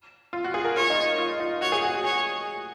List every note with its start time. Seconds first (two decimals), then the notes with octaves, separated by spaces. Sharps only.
0.33 F4
0.44 F#4
0.54 G#4
0.65 A#4
0.76 F4 C#5
0.90 D#4
1.18 F4
1.40 D#4
1.61 F#4 C#5
1.72 G#4
1.84 F#4
1.94 F#4
2.04 G#4 C#5